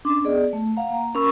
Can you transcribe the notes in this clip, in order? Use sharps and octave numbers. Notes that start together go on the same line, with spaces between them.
C#4 D4 C6 D6
B3 G#4 D5 D#5
A3
F5 F#5 A#5
A#3 A#5
C#4 A#4 B5 C#6 E6